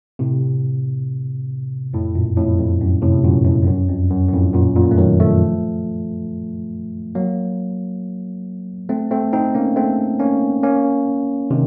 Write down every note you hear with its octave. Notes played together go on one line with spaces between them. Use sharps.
A2 C3
F2 A2
F#2 A#2
F2 A2
F2
F#2
A2 C3
F#2 A#2
F2 A2
F2
F#2
F2
F#2
F#2
F2 A2
F#2 A#2
F#2 A#2
A3
D#3 F#3
F3 A3
F#3 A#3
A3 C4
A3 C4
C4 D#4
A#3 C#4
A3 C4
A#3 C#4
A#3 C#4
C3 D#3